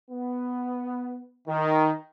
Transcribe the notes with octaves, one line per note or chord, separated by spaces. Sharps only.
B3
D#3